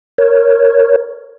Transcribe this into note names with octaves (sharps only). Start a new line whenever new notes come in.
A#4 C#5